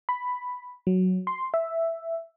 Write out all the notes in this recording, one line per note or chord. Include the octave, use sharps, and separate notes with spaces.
B5
F#3
C6
E5